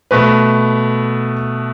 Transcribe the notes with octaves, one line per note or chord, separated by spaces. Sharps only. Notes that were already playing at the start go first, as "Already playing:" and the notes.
B2 A3 B4